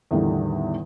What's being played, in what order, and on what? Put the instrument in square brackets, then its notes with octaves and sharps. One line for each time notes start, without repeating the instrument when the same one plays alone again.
[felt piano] E2 A2 D3 D#3 G3